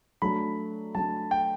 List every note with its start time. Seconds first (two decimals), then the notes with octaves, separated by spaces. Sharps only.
0.22 F#3 A3 D4 B5
0.95 F#3 A3 D4 A5
1.31 G5